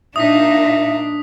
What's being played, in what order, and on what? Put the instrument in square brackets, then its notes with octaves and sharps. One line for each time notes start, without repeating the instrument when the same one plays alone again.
[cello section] A#2 D#4 F5 [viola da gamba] D4 [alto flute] E5 [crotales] D#6 B6